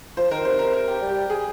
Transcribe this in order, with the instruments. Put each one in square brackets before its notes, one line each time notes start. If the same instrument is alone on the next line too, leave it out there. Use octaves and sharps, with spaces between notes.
[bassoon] F3 [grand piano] C5
[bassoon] D#3 [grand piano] A#4
[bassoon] C3 [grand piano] C5
[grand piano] A#4
A#4
G4
[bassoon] G3
[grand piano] G4
G#4